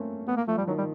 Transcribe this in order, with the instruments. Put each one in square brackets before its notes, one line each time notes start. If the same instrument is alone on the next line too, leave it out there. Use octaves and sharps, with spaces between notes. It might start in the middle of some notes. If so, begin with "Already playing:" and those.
Already playing: [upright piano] A3 A#3 C4 C#4
[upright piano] A3 [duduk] B3
[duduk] A#3
[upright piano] F3 [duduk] A3
[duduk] G3
[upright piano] D#3 [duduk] F#3
[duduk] G3